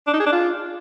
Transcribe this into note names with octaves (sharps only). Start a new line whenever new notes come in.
D4
D#4
G#4
D4
F4